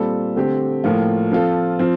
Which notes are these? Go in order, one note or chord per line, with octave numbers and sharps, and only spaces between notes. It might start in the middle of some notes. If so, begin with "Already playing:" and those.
Already playing: A#2 G3 C4 F4 A4
D3 A3 C4 G4
A2 F3 A#3 F4
F3 C4 F4 A4
F3 C4